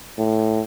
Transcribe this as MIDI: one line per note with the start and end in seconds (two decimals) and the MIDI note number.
0.18 0.61 45